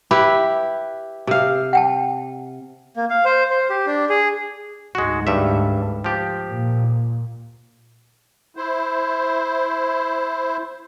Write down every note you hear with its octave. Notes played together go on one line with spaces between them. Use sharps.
E4 G4 B4 B5
C3 F5
F#5 G5 A5
A#3
F5
C5
C5
G4
D4
G#4
D2 G#2 G#3 F#4
G2 G3 E5
F3 G4
A#2
E4 C5